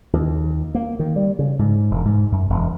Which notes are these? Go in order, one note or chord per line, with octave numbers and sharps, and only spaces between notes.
D#2
A#3
D#3
G3
C#3
G#2
E1
G#2
F#2
E1